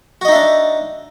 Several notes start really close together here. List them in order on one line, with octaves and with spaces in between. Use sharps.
F#4 D#5 D#4 E5 D4